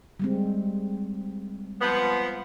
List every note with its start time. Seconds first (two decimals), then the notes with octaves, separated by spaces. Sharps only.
0.20 G3 G#3 C4
1.81 F3 B3